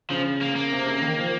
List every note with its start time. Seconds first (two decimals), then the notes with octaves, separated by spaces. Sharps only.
0.10 C#3 F3
0.41 A#3
0.56 A#3
0.72 C3
0.86 C#3
1.02 D#3
1.18 F3